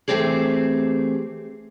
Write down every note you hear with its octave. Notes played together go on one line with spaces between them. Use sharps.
E3 F#3 A3 C4 G4 G#4